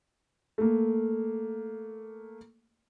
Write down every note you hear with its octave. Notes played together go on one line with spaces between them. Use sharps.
A3 A#3